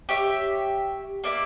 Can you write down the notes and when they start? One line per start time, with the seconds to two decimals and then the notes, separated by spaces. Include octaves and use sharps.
0.09 G4 C#5 E5
1.24 A#3 D5 E5